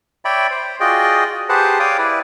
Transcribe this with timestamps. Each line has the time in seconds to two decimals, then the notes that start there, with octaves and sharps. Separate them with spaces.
0.25 C#5 D5 E5 G5 B5
0.51 C5
0.80 F4 F#4 G#4 D5 D#5 G5
1.49 G4 G#4 B4 C5 F#5 A5
1.79 C#5 D5 F5 G5 D#6
1.98 E4 B4 D5